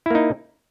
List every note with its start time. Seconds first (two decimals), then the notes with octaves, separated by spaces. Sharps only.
0.06 E4
0.10 A#3
0.15 D#4